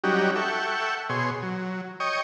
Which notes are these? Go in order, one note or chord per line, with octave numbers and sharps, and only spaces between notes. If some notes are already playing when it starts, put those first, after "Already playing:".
F#3 G3 C#4 D#4 F#4 G4
A4 E5 F#5 G5 C#6
B2 G#4 C#5 C6
F#3
C#5 D#5 G5 C#6 D#6